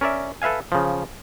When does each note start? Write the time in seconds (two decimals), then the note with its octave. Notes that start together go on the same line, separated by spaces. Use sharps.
0.01 C#4 A#4 D5 E5
0.42 A4 B4 E5 F5 G#5
0.72 C#3 F3